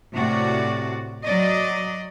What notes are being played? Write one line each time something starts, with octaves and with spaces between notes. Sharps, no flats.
A2 C3 F#4 D5
F#3 D5 D#5